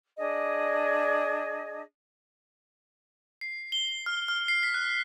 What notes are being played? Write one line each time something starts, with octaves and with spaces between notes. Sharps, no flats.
D4 G#4 D#5
C7
G7
F6
F6
C7
B6
F#6